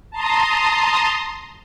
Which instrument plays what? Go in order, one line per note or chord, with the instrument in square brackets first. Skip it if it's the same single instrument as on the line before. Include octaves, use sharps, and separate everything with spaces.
[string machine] A5 A#5 C6 D#6